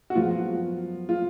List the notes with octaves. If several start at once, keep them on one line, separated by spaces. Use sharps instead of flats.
F#4
F#2 F3 G#3 B3 F4
F4